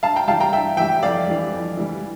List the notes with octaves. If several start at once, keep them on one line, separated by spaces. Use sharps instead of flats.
G2 F5 A5
G5 A#5
E3 G3 F5 A5
G5 A#5
G2 E5 G5
E3 G3 E5 G5
F2 D5 F5
E3 G3
F2
E3 G3